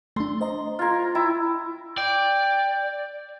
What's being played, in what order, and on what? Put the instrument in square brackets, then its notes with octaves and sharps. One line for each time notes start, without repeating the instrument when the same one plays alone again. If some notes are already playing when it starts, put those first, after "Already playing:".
[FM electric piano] A3 D4 [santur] C6
[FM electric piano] C5 D#5 A#5
[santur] F4 A#4 [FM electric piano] F6 G#6
[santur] E4 [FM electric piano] G5
[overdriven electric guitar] D5 [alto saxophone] G5